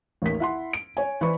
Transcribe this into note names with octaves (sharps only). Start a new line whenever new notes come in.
A1 D#2 D#3 B6
E4 F#5 C6
D7
C#5 G#5
E3 B4 C5 D5 B5 C#6